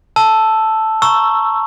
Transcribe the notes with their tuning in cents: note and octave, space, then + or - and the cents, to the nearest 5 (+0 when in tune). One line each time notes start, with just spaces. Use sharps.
A5 +0 E6 +0
A#5 +0 C#6 +0 E6 +15